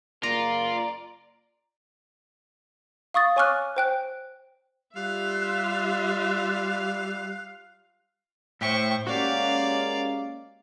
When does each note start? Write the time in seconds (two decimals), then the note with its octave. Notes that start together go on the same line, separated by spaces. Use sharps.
0.23 F#1 A#3 F4 D5 A#5
3.14 F5 C#6 D#6 A6
3.36 C#5 G#5 C#6 D6 F6 F#6
3.77 C5 G5 F#6
4.96 G3 F4 E5 F5 F#6
8.61 A2 C5 E5 G5 C#6
9.07 G#3 A#3 C#4 F#4 G4 D5 F5